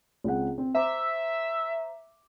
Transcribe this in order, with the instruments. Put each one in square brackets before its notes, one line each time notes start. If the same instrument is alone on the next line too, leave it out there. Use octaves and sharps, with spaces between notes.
[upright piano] C#2 C4 F#5
C4
[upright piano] C5 A#5 D6 [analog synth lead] E5